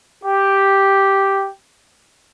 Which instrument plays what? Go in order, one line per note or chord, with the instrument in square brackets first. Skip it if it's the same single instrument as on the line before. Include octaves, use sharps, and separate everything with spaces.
[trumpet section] G4